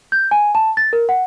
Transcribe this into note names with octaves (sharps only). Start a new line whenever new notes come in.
G6
G#5
A5
A6
A#4
F#5